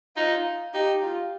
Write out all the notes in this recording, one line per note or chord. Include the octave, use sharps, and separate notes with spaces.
D#4 F4
D#4 G4
F4